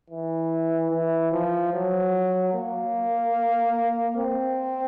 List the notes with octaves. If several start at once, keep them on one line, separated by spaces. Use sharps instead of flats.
E3
E3
F3
F#3
A#3
C4